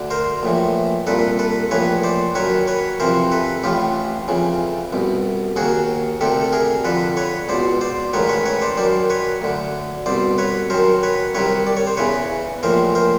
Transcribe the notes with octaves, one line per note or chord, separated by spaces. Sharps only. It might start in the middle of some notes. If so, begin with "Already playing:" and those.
Already playing: D2 D3
A#4 C5
A#1 A2 E3
C2 A#2 A4 B4
A4 B4
A#1 A2 E3 B4 C#5
C5 D5
F#2 D#3 B4 C#5
B4 C#5
F2 C3 E3 A#4 C5
A4 B4
A1 A2 E3 F4 G4
F2 C#3 E3
C2 B2
D#2 D#3 F#4 G#4
D2 C3 D#3 G4 A4
A4
G#4 A#4
F2 D3 A4 B4
B4 C#5
C#2 B2 C5 D5
C5 D5
A1 G#2 D#3 B4 C#5
B4 C#5
B4 C#5
C5 D5
F#2 D#3 C5 D5
B4 C#5
D2 D3
C2 B2 C5 D5
B4 C#5
F#2 D#3 A#4 C5
B4 C#5
C2 C3 D#3 B4 C#5
D5
C#5
C5
E2 C#3 E3 B4 C#5
A#1 A2 E3 A#4 C5
A#4 C5